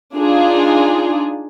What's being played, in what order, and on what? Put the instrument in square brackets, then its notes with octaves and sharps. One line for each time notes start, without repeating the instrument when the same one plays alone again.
[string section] D4 D#4 F4 G#4